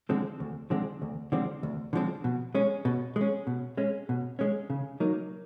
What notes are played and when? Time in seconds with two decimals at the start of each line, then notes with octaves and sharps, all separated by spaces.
0.09 D3 F3 G#3 C4
0.40 D2
0.70 D3 F3 G#3 C4
1.02 D2
1.32 D3 F3 G#3 C4
1.63 D2
1.93 D3 F3 G#3 C4
2.24 B2
2.55 G#3 C#4
2.85 B2
3.16 G#3 C#4
3.47 B2
3.77 G#3 C#4
4.09 B2
4.39 G#3 C#4
4.70 C#3
5.00 F#3 A#3 D#4